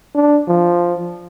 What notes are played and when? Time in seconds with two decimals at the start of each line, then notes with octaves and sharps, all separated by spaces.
0.15 D4
0.48 F3